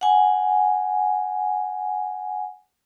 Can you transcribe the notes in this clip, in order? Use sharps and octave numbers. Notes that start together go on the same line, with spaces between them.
F#5 G#5